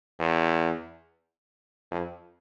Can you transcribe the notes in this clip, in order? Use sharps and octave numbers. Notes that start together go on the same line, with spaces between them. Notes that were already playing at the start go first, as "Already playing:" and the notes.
E2
F2